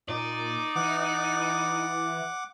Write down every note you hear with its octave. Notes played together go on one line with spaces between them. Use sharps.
A#2 D#4 D5
E3 F#5 D6